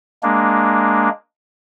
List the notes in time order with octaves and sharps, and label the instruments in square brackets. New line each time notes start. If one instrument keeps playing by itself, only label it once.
[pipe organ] G#3 A#3 D4